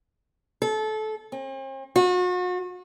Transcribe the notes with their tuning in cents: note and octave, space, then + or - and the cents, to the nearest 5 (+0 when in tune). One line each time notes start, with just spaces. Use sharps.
A4 -25
C4 +45
F#4 -40